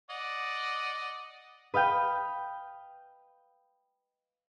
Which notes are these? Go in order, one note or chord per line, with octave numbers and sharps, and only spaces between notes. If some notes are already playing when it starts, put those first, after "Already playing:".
D5 D#5 F#5
B4 D#5 F5 G5